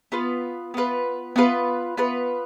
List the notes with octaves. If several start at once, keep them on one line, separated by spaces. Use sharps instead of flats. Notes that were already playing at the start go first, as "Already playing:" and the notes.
B3 F4 B4
B3 F4 B4
B3 F4 B4
B3 F4 B4